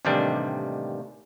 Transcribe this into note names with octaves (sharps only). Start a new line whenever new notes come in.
A1 D#2 C3 D#3 G3 D4